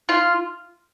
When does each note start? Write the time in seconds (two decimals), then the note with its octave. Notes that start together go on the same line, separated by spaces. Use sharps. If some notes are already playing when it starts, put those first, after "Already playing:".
0.09 F4